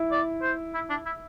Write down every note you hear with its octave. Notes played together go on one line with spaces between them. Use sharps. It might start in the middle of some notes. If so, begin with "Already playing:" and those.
Already playing: E4
D5
C5
E4
D4
E4